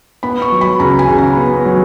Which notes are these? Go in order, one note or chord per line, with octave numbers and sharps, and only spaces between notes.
B3 B5
C#6
F#3
B5
C#2 A#5
G#5
C#3
A#5
B3
F#3